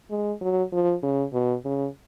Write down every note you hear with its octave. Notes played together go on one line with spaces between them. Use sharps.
G#3
F#3
F3
C#3
B2
C#3